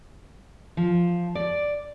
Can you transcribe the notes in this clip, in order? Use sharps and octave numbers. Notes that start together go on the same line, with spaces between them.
F3
D5